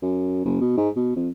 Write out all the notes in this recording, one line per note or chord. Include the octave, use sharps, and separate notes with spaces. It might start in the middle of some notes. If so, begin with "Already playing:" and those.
F#2
F#1
B2
G#2
B2
F2